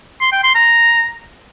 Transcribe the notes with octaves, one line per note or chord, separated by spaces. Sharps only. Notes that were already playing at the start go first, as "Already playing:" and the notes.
C6
G5
C6
A#5